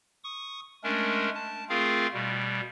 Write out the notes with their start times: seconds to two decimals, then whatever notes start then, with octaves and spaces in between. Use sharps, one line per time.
0.24 C#6 D#6
0.84 G#3 A3 C#4 D4 A#4
1.35 A5
1.69 A3 C4 F4 G#4 A#4 F5
2.14 B2 G3